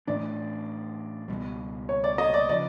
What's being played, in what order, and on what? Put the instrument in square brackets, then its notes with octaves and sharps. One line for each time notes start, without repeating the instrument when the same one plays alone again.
[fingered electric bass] A2 E3 A3 D4 [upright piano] D5
[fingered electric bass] C#2 B2 G3
[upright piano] C#5
D5
D#5
D5
[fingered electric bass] C#3 F3 [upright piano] D5